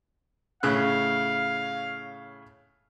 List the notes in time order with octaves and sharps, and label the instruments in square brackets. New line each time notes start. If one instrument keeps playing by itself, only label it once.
[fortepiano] A2 C#3 F#6 [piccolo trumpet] F5